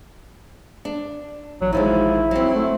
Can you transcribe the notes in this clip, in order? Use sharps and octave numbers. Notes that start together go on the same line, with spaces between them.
D4
A1 F#3
D#3 F3 G#3 E4
F#3 C4
A3